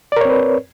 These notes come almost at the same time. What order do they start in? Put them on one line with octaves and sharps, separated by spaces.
D5 A#4 C#5 C4 B4